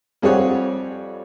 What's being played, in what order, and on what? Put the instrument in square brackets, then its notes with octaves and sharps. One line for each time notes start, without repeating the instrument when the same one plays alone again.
[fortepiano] F2 G3 C4 G#4 C#5 F#5